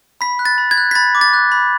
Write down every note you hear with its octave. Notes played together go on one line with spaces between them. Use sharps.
B5 B6
F#6
A6
B5
G#6
F#6
B6
B5 A6
D6
A6
F#6
B5